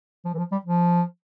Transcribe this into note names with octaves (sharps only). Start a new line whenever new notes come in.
F3
E3
F3
G3
F3